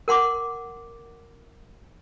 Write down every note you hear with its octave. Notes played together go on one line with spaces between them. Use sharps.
A#4 F#5 C6 D6